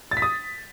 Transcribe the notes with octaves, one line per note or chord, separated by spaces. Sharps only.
A6
B6
D#6